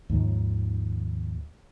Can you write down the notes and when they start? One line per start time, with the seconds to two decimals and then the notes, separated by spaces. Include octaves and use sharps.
0.09 D#2 G#2 D#3 F3